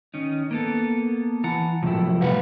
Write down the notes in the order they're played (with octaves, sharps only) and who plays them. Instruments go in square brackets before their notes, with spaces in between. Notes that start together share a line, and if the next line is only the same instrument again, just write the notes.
[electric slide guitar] D#3 C#4 D#4
A#3 B3 A4
[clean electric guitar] E3 [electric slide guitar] F#5 A5 A#5
[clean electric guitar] F#2 A2 F3 [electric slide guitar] C3 E4
[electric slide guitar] E3 G3 [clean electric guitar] B4 F5 F#5